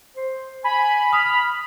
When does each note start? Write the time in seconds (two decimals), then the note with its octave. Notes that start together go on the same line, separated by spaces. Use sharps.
0.16 C5
0.64 G#5 B5
1.13 D#6 F6 B6